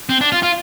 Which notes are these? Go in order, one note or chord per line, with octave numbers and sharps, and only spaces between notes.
C4
D4
F4
F4